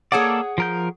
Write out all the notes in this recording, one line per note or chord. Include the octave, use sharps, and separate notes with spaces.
A#3 G#4 A4 C#5 D5 F#5
F3 A#4 G6